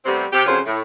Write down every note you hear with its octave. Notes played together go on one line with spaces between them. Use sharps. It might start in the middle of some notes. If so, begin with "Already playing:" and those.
C3 G3 A3 B3 C4
C3 G4
F2 C#3 F#3 F4 A#4 C5
A2